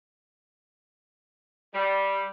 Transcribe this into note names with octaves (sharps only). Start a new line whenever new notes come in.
G3